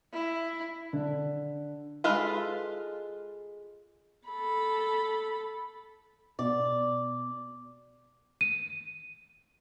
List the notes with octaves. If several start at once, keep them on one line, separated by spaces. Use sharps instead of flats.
E4
D3
G#3 F4 A4 B4
A4 B5
B2 D5
D#7